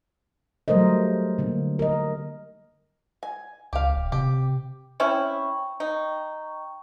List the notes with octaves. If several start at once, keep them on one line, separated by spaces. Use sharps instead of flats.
F#3 G3 A3 A#4 C5 D#5
D3 A#3
A#4 D#5
G#5
C#2 G4 F5
D1
C3 G4
C4 C#4 E4 G5 C#6
D#4